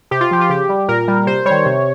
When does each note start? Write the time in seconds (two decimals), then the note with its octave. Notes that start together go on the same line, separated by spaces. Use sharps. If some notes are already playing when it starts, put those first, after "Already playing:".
0.11 C3 G4
0.21 F4
0.31 F3 G4
0.41 F4
0.50 C#3 G4
0.69 G3
0.88 A#2 A#4
1.08 G3
1.27 C3 C5
1.45 G3 C#5
1.51 D#3
1.66 C3